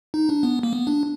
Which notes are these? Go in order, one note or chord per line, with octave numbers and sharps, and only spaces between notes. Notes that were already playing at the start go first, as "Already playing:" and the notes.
D#4
D4
B3
A#3
B3
D4